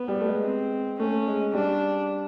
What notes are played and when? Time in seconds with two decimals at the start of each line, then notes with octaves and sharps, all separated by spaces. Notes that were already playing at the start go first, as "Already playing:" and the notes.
Already playing: B3
0.08 G3
0.21 A3
0.27 G#3
0.45 C4
0.99 A3 C#4
1.27 G#3
1.54 G3 D4